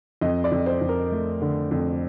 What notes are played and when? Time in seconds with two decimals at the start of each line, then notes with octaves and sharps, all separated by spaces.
0.21 F2 D#5
0.44 D5
0.52 F2
0.66 C5
0.81 F2
0.89 A#4
1.12 A3
1.41 D3
1.71 F2